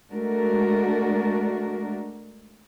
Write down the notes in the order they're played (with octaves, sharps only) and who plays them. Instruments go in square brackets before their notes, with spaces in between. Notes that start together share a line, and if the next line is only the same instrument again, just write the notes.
[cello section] G#3 A3 D4 F#4 A#4